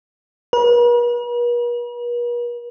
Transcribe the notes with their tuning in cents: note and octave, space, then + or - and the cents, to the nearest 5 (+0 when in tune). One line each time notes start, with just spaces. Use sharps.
B4 -45